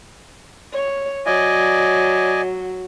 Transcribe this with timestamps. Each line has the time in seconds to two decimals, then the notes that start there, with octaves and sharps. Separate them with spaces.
0.73 C#5
1.26 F#3 D5 D#5 G#5